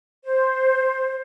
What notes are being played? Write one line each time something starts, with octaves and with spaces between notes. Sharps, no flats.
C5